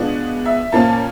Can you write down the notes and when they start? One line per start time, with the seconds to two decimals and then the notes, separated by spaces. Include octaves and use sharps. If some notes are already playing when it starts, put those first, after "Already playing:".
Already playing: B2 G#3 B3 D4 F4
0.45 E5
0.72 A#2 F3 A#3 C#4 F4 A5